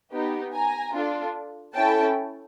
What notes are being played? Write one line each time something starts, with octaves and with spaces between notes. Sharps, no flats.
B3 D#4 G4
G#5 A#5
D4 F4 A4
C#4 E4 A4 G5 A5